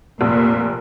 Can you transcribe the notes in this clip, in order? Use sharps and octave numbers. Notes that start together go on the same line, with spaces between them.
F1 A#2